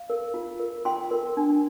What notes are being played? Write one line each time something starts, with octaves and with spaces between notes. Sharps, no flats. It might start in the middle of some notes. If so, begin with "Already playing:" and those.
Already playing: F5
A#4
F4
A#4
F4 G5 C6
A#4
D4